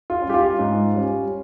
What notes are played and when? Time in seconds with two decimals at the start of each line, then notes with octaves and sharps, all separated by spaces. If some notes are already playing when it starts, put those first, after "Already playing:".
0.10 F4
0.22 C#4
0.27 G3 G4
0.34 F4
0.59 G#2
0.95 G3 C#4